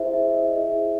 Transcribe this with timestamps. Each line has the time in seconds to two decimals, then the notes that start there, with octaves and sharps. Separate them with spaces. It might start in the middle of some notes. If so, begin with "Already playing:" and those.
Already playing: E4 G#4 C5 E5
0.13 E5
0.34 D#5
0.54 E4 G#4 C5 E5